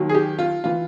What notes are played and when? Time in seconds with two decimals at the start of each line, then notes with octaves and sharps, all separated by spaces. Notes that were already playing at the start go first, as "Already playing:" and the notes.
Already playing: D#2 D#3 F#3
0.09 G#4
0.14 G4
0.39 F4
0.64 E3 F4